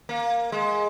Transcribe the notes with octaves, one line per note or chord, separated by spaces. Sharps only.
A#3
G#3